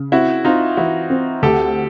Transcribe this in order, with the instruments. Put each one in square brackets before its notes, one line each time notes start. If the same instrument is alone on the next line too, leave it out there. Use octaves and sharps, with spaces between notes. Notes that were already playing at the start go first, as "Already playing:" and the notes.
Already playing: [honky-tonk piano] C#3
[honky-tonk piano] C4 [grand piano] E4 F#4
[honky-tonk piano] C4 [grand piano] D#4 F4
[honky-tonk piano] E3 [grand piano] E4 F#4
[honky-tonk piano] C4
[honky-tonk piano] D2 [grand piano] G4 A4